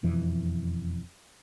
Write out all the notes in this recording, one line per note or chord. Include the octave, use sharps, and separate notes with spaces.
E1 F2 E3